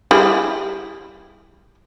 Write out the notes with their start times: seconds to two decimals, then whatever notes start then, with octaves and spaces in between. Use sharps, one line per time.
0.11 G3 E4 G#4